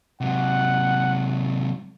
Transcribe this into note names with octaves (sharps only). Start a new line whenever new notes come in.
C3 F#3 F#5